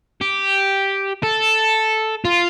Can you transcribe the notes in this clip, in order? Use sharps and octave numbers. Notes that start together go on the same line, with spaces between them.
G4
A4
F4